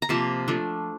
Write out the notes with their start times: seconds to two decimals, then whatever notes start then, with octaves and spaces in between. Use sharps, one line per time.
0.02 A#5
0.09 C3 F3 A#3 A5
0.48 F3 A3 D4